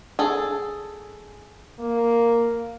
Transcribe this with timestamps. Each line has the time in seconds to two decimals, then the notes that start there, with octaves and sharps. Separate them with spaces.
0.19 G#4 A4
1.79 A#3